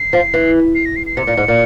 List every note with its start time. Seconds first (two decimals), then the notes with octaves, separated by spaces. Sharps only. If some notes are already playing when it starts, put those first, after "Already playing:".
Already playing: C7
0.13 F3
0.34 E3
0.75 C7
0.85 A#6
0.96 C7
1.07 C7
1.17 C3 C#7
1.27 A#2
1.37 G#2
1.48 A#2